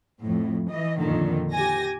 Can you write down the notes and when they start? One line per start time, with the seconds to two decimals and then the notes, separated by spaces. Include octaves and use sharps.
0.20 F2 A2
0.68 E3 D#5
0.98 F2 A#2 D3 D#3
1.53 G4 G#5 A#6